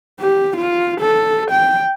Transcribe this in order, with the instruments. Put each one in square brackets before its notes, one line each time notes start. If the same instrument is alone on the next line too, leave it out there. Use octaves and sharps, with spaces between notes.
[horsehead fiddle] G4
F4
A4
G5